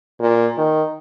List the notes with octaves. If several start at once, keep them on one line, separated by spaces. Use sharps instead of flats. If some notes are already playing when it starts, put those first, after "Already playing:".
A#2
D#3